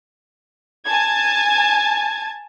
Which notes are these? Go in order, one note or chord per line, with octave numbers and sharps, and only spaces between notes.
G#5 A5 G#6